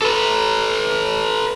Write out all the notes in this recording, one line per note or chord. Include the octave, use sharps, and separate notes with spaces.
A4 B4